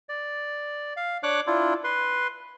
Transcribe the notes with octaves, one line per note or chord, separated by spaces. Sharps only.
D5
F5
D4 C#5 D6 F#6
D4 E4 F4
B4 C6